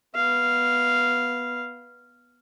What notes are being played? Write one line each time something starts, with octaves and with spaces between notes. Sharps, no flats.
B3 F5